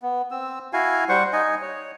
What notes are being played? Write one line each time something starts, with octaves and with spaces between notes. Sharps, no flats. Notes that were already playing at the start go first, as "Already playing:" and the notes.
B3
C4 E6
E4 F#4 F5 G#5
G3 C5 F#5 C#6
D#4 D#5 G#5
C#5